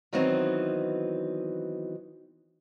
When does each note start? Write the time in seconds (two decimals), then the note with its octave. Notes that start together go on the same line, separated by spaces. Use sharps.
0.13 D#3 E3 F#3 B3 C4 D#4